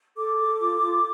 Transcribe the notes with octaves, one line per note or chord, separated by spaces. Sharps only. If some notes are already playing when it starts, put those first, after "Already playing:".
A4 D6
A4
F4
F4